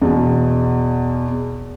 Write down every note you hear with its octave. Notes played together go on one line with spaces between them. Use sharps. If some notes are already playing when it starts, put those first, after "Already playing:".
E2 B2